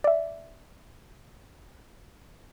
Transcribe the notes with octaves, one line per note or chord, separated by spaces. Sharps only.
D5 E5